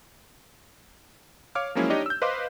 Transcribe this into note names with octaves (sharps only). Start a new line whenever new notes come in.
C#5 F5 D6 F6
F3 F#3 G#3 A#3 C#4 E4
D4 D#4 G4 C#5 D#5
E6 G6
B4 C5 D#5 F5 C6 D6